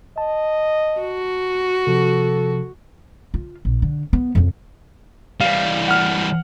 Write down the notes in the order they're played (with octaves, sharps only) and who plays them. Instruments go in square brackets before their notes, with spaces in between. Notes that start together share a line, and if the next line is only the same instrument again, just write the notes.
[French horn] D#5 [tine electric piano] A5
[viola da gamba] F#4
[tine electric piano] C3 F3 [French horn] A4
[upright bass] F4
A#1
D3
B3
F2 C#3
[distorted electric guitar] E3 G3 [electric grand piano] F5
[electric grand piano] F#5 F6